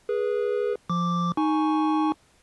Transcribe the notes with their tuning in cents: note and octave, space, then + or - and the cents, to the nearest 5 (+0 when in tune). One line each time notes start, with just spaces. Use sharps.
G#4 +0 B4 -20
F3 -5 D6 +0
D#4 +0 G#5 +10 C#6 +0